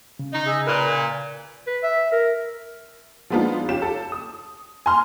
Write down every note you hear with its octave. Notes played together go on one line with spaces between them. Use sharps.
C#3
D#4
G#4 D#5 E5
A#2 A#4 B4
G#5
B4
E5
A#4
F3 G#3 B3 D4 D#4 F4
C#4 F4 G4 E7
A4
D#6
G#5 A#5 C6 F6